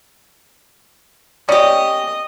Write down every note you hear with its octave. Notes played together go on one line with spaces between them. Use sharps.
C#4 G4 D5 D#5